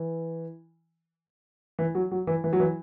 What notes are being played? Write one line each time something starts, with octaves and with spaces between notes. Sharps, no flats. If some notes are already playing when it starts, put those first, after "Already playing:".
Already playing: E3
E3
F#3
F#3
E3
E3
F#3
E3